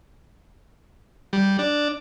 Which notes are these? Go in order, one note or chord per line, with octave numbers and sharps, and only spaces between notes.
G3
D4